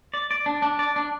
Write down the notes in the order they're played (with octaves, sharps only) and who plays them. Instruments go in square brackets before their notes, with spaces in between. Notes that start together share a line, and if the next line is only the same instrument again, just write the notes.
[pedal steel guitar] D5
D5
D4
D4
D5
D4